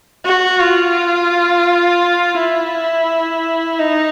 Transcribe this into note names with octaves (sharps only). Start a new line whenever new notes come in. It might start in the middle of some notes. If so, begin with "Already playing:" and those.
F#4
F4
E4
D#4